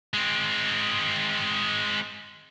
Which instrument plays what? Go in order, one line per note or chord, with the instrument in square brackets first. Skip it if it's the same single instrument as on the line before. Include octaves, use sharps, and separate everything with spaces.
[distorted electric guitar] G#3 C4